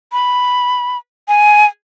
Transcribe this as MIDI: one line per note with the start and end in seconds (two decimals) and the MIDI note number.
0.12 0.97 83
1.28 1.66 80